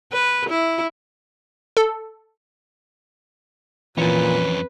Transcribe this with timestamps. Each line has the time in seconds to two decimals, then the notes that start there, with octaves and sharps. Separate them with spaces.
0.13 B4
0.50 E4
1.77 A4
3.98 F2 A#2 E3 C#4 B4